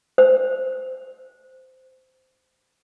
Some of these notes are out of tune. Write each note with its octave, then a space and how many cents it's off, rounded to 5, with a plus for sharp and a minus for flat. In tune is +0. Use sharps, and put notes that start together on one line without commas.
C5 -10